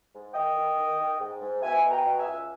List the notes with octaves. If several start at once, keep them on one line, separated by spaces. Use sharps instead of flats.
G#2
D#3 D#5 G5
D#3
D#3
D#3
G#2
G#2
B2 E5 G#5
B2
G5 A#5
B2
E5 G#5
C#2